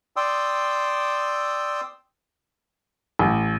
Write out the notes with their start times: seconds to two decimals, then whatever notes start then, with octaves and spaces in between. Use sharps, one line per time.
0.16 D5 G5 C6 D#6 E6
3.19 A1